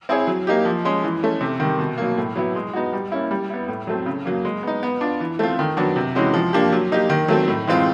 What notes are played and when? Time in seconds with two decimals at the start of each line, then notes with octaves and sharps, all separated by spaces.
0.09 C4 E4 G#4 C#5
0.27 F#3
0.47 A#3 D#4 G4
0.65 F3
0.85 G#3 C#4
1.04 E3
1.23 A3 C#4
1.41 C3
1.60 D#3 G3
1.79 B2
1.98 F#3 A#3
2.17 A2
2.36 F#3 B3 E4
2.55 G#3
2.73 B3 D#4 F#4
2.93 G3
3.12 A#3 C#4 E4
3.31 G3
3.50 B3 E4
3.68 A2
3.87 F#3 A3 C4
4.06 C#3
4.25 F#3 A#3
4.45 G#3
4.63 B3 D#4
4.83 B3
5.01 D4 F4
5.20 E3
5.39 A3 C4 F4
5.59 D#3
5.77 F#3 B3 D4 F#4
5.96 C3
6.15 E3 G#3 C#4 F#4
6.34 F3
6.53 A#3 D4 G4
6.72 F#3
6.92 A#3 D#4 G4
7.10 D#3
7.28 F#3 A3 C4
7.48 A2
7.67 E3 G#3 C4 F4